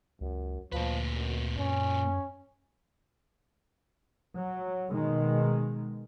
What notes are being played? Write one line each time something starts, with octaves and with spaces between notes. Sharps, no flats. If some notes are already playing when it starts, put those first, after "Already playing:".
C#2 F#2
D2 A#2 F3 B4
F#2
F#2 C#4
F#3
B2 D#3 G#3